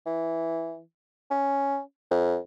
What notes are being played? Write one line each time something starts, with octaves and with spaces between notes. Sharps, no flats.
E3
C#4
F2